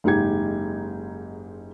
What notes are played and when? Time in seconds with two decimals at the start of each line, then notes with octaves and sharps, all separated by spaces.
0.04 F#1 G#2 D#4 G4 G#6